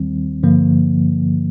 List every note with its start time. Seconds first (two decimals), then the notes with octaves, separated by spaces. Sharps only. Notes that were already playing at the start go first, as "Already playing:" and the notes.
Already playing: D#2 D#3 G3 C4
0.43 G2 D3 F3 A#3